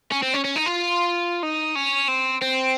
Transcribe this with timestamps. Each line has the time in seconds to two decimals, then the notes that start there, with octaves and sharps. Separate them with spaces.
0.12 C#4
0.22 C4
0.34 C#4
0.44 C#4
0.56 D#4
0.66 F4
1.43 D#4
1.75 C#4
2.08 C4
2.41 C4